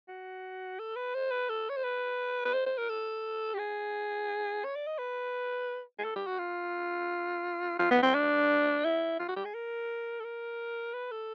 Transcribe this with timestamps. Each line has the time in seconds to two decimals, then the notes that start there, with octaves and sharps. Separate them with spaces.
0.09 F#4
0.79 A4
0.96 B4
1.15 C5
1.31 B4
1.49 A4
1.70 C#5
1.77 C5
1.84 B4
2.45 B4
2.53 C5
2.66 C5
2.78 A#4
2.89 A4
3.54 G4
3.59 G#4
4.64 C#5
4.76 D5
4.87 D#5
4.99 B4
5.99 G#4
6.04 A4
6.16 G4
6.27 F#4
6.38 F4
7.79 F4
7.91 B3
8.03 C4
8.15 D4
8.85 E4
9.19 F4
9.28 F#4
9.36 G4
9.45 G#4
9.54 A#4
10.20 A4
10.24 A#4
10.93 B4
11.11 A4